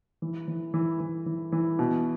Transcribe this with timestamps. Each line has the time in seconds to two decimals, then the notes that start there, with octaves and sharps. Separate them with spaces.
0.22 E3
0.48 E3
0.74 E3
1.00 E3
1.26 E3
1.52 E3
1.79 B2